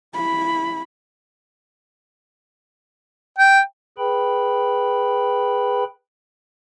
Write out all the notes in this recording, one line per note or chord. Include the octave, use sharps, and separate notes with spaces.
E4 B5
G5
G#4 B4 G5 B5